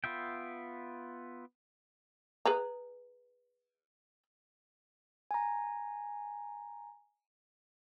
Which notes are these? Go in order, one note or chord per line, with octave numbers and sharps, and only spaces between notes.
B3 F4 E5 G5
G#4 B4 A#5
G#5 A#5